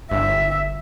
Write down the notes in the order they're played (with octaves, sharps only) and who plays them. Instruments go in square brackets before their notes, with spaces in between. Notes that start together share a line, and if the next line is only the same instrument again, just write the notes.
[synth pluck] G1 [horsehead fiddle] E5